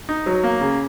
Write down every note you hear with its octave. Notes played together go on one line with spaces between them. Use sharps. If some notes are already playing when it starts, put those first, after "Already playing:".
D#4
F#3
A#3
C#3